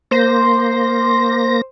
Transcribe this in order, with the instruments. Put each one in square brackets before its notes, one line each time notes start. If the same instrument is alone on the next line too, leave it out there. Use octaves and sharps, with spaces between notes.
[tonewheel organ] A#3 A#6 [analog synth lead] C5